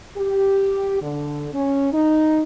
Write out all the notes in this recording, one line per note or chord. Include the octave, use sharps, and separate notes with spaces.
G4
D3
C#4
D#4